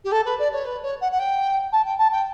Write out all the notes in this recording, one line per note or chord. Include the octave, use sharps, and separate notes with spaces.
G4
A4
B4
D5
C#5
B4
C#5
F#5
F#5
G5
A5
G5
A5
G5